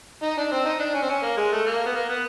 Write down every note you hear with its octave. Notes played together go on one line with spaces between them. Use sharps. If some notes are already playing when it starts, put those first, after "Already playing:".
D#4
D4
C4
D#4
D4
C#4
C4
C#4
A#3
G#3
A3
A#3
B3
A#3
B3